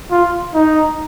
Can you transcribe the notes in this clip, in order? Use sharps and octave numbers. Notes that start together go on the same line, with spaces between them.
F4
D#4